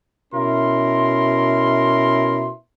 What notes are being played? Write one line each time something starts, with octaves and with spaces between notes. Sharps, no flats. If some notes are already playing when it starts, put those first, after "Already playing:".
B2 C#4 E4 A#4 C6